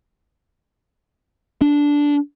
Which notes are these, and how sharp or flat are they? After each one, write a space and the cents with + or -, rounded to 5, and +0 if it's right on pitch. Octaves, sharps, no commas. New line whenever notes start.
D4 -10